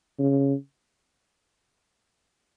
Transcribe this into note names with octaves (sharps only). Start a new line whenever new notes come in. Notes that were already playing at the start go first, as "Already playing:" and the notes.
C#3